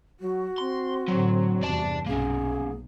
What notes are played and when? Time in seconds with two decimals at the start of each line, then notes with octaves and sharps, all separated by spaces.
0.20 F#3 F#4
0.58 C4 C6
1.08 A2 D3 F#3
1.63 E2 G2 C3 D5 A5
2.07 B1 A#3 C4 C#4 G#4